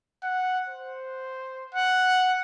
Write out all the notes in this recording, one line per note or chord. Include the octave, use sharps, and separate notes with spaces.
F#5
C5
F#5